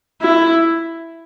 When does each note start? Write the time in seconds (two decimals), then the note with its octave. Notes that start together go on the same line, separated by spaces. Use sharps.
0.22 E4